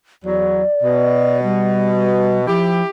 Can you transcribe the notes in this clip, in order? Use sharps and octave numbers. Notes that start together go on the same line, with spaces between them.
E2 F#3 D5
B2
G3
F3 E4 G4